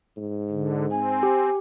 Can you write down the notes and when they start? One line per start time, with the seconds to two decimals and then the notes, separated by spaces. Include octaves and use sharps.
0.17 G#2
0.50 D3
0.91 C4 G#5
1.23 G4